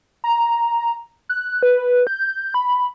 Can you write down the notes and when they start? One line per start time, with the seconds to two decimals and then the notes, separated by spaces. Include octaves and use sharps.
0.24 A#5
1.29 F#6
1.63 B4
2.07 G6
2.54 B5